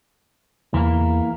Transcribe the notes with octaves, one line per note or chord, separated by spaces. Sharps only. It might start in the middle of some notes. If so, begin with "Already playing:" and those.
E2 E3 A#3